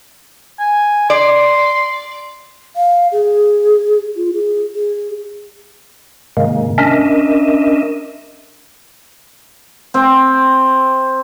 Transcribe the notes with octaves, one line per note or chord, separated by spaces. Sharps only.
G#5
D5 C6
F5
G#4
F4
G#4
G#4
G#2 C3 D#3 G#3 A#3
C#4 D4 A#4 D#5 E5
C4